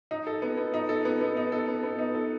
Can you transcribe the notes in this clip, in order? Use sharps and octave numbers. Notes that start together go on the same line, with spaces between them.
D#4
A4
B3
B3
D#4
A4
B3
B3
D#4
A4
B3
B3
D#4
A4